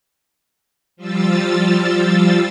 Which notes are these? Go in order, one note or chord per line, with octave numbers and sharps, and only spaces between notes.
F3 G3 F4 E6 A6